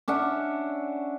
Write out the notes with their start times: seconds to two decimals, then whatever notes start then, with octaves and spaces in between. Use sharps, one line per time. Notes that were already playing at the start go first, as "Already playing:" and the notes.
0.08 C#4 D4 E5 F#5